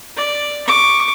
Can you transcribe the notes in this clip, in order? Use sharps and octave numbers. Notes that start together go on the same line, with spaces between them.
D5
C#6 D6